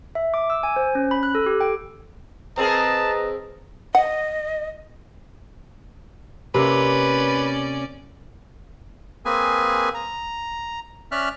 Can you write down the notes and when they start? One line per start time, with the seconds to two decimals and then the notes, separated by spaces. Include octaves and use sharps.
0.15 E5
0.34 D6
0.50 E6
0.63 G#5
0.76 C5
0.95 C#4
1.11 B5
1.23 F#6
1.35 A4
1.46 G4
1.60 G5
2.57 C4 G#4 A#4 B4 D#5 A5 A#5
3.95 D#5 F#5
6.54 C3 A#3 C#4 B4 D5
9.25 A#3 C4 G#4 B4 G#5
9.94 A#5
11.12 C#4 D5 E5 F6 F#6